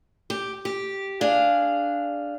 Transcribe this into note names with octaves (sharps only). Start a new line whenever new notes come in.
G4
G4
D4 G#4 F5